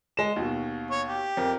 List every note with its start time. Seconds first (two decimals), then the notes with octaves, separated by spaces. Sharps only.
0.17 G#3 E7
0.36 D#2 B2
0.91 C#5
1.08 G4
1.37 F2 A#4